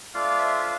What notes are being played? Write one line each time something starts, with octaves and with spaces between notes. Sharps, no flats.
A3 D4 F4 D5 F5
C5 E5
F5